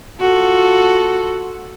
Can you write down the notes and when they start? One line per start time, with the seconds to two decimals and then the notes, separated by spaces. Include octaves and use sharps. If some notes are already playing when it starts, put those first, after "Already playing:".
0.19 F4 F#4 A4